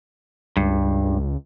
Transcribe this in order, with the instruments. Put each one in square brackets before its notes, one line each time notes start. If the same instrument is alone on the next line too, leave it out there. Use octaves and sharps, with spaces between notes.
[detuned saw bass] C#2 [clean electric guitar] G2